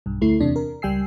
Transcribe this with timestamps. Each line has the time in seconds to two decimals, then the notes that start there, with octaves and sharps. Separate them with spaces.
0.06 B1 G2
0.21 D2 A3 E4 C7
0.40 E2 C3 D4
0.56 A#4
0.82 C#2 G3 G5 G#5 E6 C7